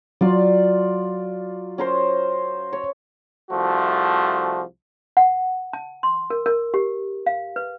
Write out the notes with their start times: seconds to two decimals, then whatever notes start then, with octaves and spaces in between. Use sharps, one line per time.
0.21 F#3 F4 D5
1.78 C#4 A#4 C5
2.73 C#5
3.51 C2 F3 A3 F#4
5.17 F#5
5.73 A5
6.03 C6
6.30 A#4
6.46 A#4
6.74 G4
7.26 F5
7.56 B4